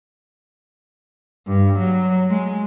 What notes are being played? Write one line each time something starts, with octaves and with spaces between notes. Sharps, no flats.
G2
F#3
G#3